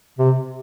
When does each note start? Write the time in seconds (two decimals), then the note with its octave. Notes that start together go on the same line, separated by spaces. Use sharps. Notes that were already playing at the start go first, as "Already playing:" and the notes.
0.19 C3